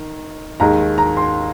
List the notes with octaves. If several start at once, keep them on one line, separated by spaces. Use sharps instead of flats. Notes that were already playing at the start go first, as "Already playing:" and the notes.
Already playing: D#3
D#2 D#3 G#3 A#5
A#5
C6